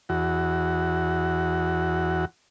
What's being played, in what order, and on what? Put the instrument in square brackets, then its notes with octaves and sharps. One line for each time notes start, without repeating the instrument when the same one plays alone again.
[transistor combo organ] E2 F#4